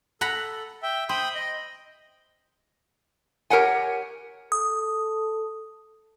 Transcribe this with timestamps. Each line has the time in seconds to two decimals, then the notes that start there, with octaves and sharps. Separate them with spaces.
0.21 A4 F#5 A#5 B5
0.83 E5 G5
1.09 C5 G5 B5 D#6
1.35 D#5
3.50 G4 A#4 C#5 F#5 G#5
4.52 A4 D#6